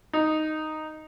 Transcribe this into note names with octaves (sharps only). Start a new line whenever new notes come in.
D#4